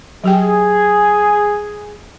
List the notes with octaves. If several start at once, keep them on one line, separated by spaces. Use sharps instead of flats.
F#3 G4 G#4 G5